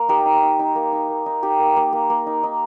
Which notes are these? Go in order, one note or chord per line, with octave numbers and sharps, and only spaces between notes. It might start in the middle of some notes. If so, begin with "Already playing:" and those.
Already playing: A#3
D#4 G4 A#4
D#4
D#4
D#4
A#3
D#4
A#3
D#4
D#4 G4
A#3
A#3
A#3
A#3
D#4
D#4